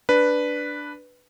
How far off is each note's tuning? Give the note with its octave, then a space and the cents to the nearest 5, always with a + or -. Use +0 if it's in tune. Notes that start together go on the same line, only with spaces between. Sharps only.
D4 +0 B4 +0